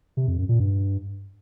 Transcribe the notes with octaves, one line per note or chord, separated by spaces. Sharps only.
C3
F2
F#2
A#2
G2